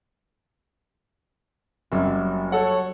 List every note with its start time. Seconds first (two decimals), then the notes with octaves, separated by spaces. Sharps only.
1.92 F#1 F#2 F#3 G3 C4
2.52 A4 C#5 F#5